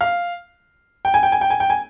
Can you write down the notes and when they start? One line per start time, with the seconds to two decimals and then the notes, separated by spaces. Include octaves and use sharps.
0.01 F5
1.05 G5
1.14 G#5
1.23 G5
1.32 G#5
1.41 G5
1.50 G#5
1.60 G5
1.70 G#5